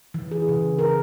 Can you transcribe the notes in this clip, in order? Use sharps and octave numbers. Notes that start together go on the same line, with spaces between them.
E3
G#4
C#3
A#4